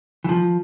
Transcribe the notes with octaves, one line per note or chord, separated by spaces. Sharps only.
E3
F3